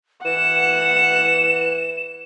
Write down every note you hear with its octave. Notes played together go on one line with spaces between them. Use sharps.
E3 F#5 E7